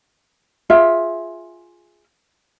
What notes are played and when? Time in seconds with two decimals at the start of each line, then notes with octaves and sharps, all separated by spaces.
0.70 F4 G#4 E5